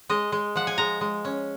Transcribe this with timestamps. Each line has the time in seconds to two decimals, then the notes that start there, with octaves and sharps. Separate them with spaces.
0.09 G#3 D#5
0.32 G#3
0.55 F3 F#5
0.67 G#5
0.78 G#3 A#5
1.01 G#3
1.25 C#4